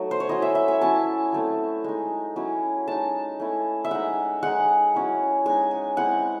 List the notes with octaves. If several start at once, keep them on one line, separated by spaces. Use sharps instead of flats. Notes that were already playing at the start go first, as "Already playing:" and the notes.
Already playing: F#3 A3 D#4
C5
C#5
F#3 C#4 E4 D#5
E5
E5
G#5
F#3 C#4 E4 A5
F#3 A3 C4
G#3 D#4
F#3 C#4 E4
G#3 D#4 A5
A3 C#4 E4
E5
G#3 D#4 F#5
G#3 D#4 F#5
F#3 C#4 E4
G#3 D#4 G#5
G#5
G#3 C4 E4 F#5